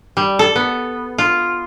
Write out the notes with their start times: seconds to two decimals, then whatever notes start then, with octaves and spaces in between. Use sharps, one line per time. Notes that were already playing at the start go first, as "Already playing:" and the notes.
0.17 G3
0.39 A4
0.56 B3
1.18 F4